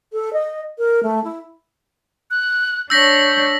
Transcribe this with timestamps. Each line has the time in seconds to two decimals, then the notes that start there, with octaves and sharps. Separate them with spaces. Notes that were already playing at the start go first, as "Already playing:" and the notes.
0.13 A4
0.33 D#5
0.78 A#4
1.03 A3
1.24 E4
2.31 F#6
2.90 D4 C#5 E6 G6 A#6 B6